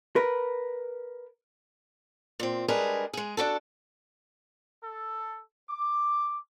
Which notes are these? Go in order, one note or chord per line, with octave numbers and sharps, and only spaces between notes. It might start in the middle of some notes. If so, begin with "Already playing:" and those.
A#4 B4
A#2 C4
G3 G#3 D4 G#4 A#4 B4
G#3 G#4
D4 F#4 A4
A4
D6